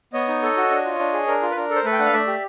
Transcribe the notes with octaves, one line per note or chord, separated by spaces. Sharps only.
B3 C#5 D#5
D#4
A4
F#4
D4
F4
D4
G#4
D4 A#4
F4
B4
D4 A#4
A4
C5
A3 A4 B4
G5
D4 F#5
F5
A3 D5 E5
G4